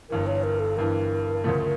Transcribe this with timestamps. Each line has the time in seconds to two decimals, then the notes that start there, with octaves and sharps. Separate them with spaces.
0.09 G1 G2 E3 A#4
0.27 C#5
0.43 A#4
0.60 A4
0.77 G1 G2 E3 A#4
1.44 D2 C#3 F3 A3